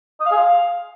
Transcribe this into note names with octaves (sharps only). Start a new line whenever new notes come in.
D#5
F5
G#4
F5